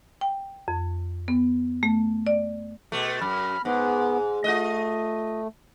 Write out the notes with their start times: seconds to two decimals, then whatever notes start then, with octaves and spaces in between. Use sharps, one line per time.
0.21 G5
0.68 F2
1.28 B3
1.83 A3
2.27 D5
2.92 B2 A3
3.21 F#2 B5 F6
3.65 G#2 B3
4.44 A3 F4 D#5